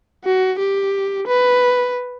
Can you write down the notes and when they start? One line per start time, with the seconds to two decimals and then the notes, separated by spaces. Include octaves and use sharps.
0.25 F#4
0.59 G4
1.27 B4